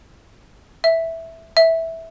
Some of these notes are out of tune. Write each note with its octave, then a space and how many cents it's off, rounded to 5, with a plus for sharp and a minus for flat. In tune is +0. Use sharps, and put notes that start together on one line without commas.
E5 -5
E5 -10